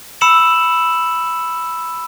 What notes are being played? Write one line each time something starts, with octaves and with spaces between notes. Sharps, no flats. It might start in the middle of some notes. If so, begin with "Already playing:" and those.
B5 E6 C#7 E7 F#7